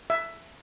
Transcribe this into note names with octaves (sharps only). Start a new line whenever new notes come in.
E5